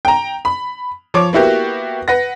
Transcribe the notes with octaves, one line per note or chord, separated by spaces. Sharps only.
G5 A#5
B5
F3 C#5 D6
A#3 B3 E4 F#4 G4
B4 F#5 A#6